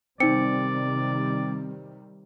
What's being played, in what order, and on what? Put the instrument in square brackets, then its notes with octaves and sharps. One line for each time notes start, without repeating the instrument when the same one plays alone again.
[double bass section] C3 D#3 G3 [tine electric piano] C4 [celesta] D#4 C#7 [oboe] D5